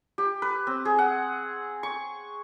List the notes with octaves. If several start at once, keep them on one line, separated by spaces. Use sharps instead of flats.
G4
B4
C4
G#4
F#5
C#6